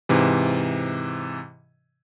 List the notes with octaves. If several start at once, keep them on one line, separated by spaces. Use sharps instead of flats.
G#2 C3 E3